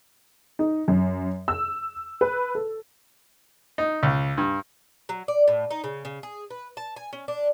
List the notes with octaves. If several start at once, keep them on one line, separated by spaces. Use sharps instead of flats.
D#4
F#2
E6
B4
A4
D#4
C#2
G2
F#3
D5
A2
D#4
C#3
C#3
G#4
B4
A5
G#5
C#4
D4